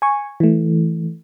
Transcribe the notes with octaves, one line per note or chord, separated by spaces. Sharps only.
G#5 C#6
E3 A3